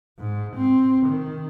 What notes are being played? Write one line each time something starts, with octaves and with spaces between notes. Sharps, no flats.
G#2
C4
D#3